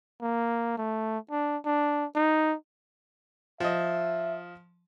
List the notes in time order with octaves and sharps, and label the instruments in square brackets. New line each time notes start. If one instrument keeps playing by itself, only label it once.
[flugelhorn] A#3
A3
D4
D4
D#4
[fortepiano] F3 D#5 [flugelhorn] E5